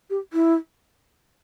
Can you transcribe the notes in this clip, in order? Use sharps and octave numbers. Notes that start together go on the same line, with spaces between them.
G4
E4